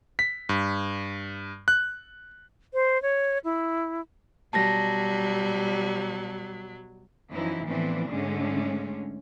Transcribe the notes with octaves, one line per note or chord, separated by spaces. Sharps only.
B6
G2
F#6
C5
C#5
E4
B2 F#3 G3 A5 A#6
F#2 E3 F3 D#4 E4
A2 E3 F3 B3 C4 D4
G#2 D3 G#3 A3 C#4